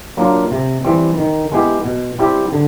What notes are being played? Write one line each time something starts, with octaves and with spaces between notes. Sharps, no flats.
F#3 A#3 D4 F4
C3
E3 G3 C4
D#3
G#3 B3 E4 G4
B2
G3 C4 E4 G4
D3